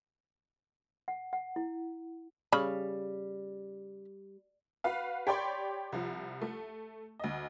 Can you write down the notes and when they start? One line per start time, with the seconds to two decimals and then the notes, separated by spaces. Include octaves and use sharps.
1.08 F#5
1.33 F#5
1.56 E4
2.52 C#3 G3 B5
4.84 F#4 B4 F5
5.27 G4 C#5 D5 G5 B5 C6
5.92 C2 F3
6.42 A3
7.19 D2 D#5